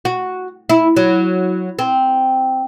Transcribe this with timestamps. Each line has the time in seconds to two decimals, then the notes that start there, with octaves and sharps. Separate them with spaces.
0.05 F#4
0.70 E4
0.97 F#3
1.79 C4